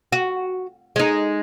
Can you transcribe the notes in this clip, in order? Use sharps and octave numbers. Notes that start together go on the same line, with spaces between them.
F#4
G#3 D#4